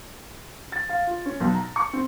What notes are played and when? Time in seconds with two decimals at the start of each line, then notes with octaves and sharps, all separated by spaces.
0.72 A6
0.89 F5
1.07 F4
1.26 C#4
1.40 B1
1.54 A#5
1.76 C#6
1.93 C4